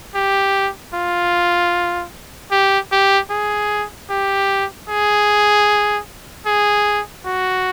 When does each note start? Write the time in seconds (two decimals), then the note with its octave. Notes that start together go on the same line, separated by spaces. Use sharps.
0.15 G4
0.94 F4
2.51 G4
2.92 G4
3.30 G#4
4.10 G4
4.89 G#4
6.46 G#4
7.25 F#4